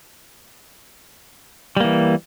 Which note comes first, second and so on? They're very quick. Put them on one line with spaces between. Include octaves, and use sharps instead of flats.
G3 A#3 E3